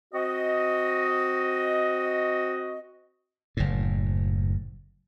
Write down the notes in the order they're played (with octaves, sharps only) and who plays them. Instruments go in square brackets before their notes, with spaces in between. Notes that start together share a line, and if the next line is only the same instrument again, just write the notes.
[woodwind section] C4 F#4 D#5
[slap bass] F#1 A2